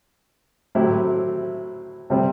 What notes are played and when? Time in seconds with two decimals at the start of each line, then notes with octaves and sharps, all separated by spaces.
0.75 A2 F#3 C4 E4 G4
2.10 C3 G3 C4